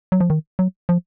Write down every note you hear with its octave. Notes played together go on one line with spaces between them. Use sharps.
F#3
F3
D#3
F#3
F3